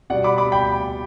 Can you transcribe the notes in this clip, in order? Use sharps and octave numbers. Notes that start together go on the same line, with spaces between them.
B2 G3 D5 F#5
B5 D6
B5 D6
G5 B5